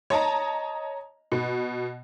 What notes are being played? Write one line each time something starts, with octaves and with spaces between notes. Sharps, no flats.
C#5 D#5 A5 A#5
B2